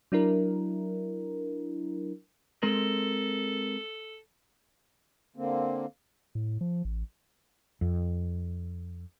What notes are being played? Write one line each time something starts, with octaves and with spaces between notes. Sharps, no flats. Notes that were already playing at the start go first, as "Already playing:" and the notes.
F#3 D4 E4 A#4
G#3 C4 A4 A#4
D3 A#3 C4
A2
F3
A1
F2